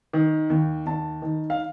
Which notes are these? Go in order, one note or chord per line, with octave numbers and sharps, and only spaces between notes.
D#3
D#2
D#2 A5
D#3
F5